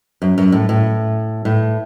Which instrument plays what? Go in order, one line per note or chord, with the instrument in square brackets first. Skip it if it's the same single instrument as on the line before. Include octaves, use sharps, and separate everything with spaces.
[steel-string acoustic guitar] F#2
F#2
A2
A2
A2